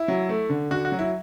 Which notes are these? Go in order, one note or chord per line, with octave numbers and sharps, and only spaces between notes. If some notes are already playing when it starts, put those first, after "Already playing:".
Already playing: E4
F#3
A3
D3
D3 F#4
F#4
F#3
E4